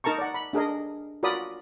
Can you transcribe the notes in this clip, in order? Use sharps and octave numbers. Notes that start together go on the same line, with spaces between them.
D#4 A#4 A5 A#5 C#6
D5 F#5
B5
D4 G#4 A#4 D#5
F4 F#4 A#4 D5 B5 D#6